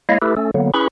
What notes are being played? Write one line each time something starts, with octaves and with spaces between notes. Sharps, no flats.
G#3 A#3 E4 C#5 D#5 F5
A3 E4 G4 A4 B4
A3 C#4 A4
D3 F#3 A#3 B3
C#4 E4 G#4 B4 B5 C#6